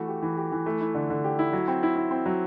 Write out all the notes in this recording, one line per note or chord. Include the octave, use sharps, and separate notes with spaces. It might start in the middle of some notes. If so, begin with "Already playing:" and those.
Already playing: E3 A3 F#4
G4
E3
G4
E3
A3
E4
D3
D3
G4
E4
F#3
C4
E4
E4
C4
F#3